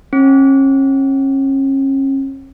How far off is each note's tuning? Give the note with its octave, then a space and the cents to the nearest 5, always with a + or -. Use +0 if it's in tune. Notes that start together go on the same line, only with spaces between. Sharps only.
C#4 -35